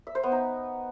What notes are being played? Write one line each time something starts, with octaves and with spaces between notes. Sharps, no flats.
E5
C5
B3
D#4